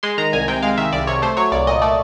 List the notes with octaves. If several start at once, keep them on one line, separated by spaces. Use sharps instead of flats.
G#3 C6
D#3 A#5
C2 G#5
C3 G5
G#3 F5
D#3 E5
C2 D5
C3 C#5
A3 C5
F#3 C#5
C2 D5
A#2 D#5
A3 D5